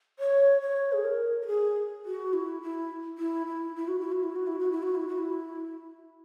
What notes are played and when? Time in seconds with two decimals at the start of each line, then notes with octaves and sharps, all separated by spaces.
0.19 C#5
0.61 C#5
0.93 G#4
1.04 A#4
1.42 A#4
1.47 G#4
2.05 F#4
2.33 E4
2.62 E4
3.18 E4
3.47 E4
3.76 E4
3.88 F#4
3.99 E4
4.12 F#4
4.24 E4
4.36 F#4
4.47 E4
4.59 F#4
4.72 E4
4.83 F#4
4.95 E4
5.08 F#4
5.18 E4